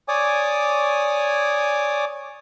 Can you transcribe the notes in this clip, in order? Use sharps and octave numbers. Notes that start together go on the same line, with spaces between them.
C#5 D5 G#5 D6 D#6